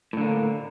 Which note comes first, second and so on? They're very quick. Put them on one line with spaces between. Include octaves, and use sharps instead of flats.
A2 D3 A#3